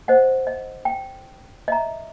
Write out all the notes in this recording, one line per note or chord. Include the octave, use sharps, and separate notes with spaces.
C5 D#5 F#5
D#5
G5
D#5 E5 A#5